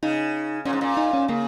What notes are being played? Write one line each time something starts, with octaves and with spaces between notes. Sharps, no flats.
C#3 D#4
A#2 C#4
G#2
A#2
D#4
C#4
C#3 A#3